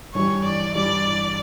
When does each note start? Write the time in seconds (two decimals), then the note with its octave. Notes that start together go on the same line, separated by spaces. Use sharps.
0.14 G2 E3 G3 C#5
0.44 D5
0.75 G2 E3 G3 D5